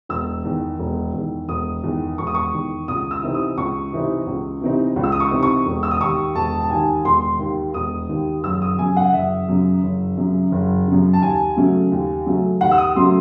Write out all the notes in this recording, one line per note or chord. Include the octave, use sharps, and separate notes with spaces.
E1 E6
E2 D#3
E1
E2 D#3
E1 D#6
E2 D#3
E1 C#6
D#6
C#6
E2 D#3
C#2 D#6
E6
C3 E3 C4 D#4
D#6
C#2 C#6
C3 E3 C4 D#4
C#2
C3 E3 C4 D#4
C#2
E6
D#6
C#6
C3 E3 C4 D#4
C#6
E1
E6
D#6
D#2 D#3 C#6
E1 A5
A5
D#2 D#3 G#5
E1 C6
D#2 D#3
E1 D#6
D#2 D#3
F#1 E6
D#6
F#2 C#3 G#5
F#5
F#1 E5
F#2 C#3
F#1
F#2 C#3
F#1
F#2 C#3
A5
D#2 G#5
C#3 F#3 A3 C#4
D#2
C#3 F#3 A3 C#4
D#2 F#5
E6
D#6
C#3 F#3 A3 C#4 C6